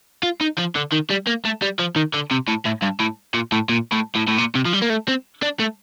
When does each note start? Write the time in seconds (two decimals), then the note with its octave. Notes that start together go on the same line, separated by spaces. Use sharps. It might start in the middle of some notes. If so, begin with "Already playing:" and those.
0.23 F4
0.41 D#4
0.58 F3
0.75 D3
0.92 D#3
1.10 G3
1.27 A#3
1.45 A3
1.62 G3
1.79 F3
1.96 D#3
2.14 D3
2.31 C3
2.48 A2
2.65 A2
2.82 G2
3.00 A2
3.34 A#2
3.52 A2
3.69 A#2
3.92 A2
4.15 A2
4.28 A2
4.38 A#2
4.55 C3
4.65 F3
4.73 G3
4.82 A#3
4.90 A3
5.08 C4
5.42 D4
5.59 A3